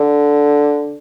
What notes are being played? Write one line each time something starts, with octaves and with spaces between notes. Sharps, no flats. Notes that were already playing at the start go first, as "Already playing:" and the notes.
Already playing: D3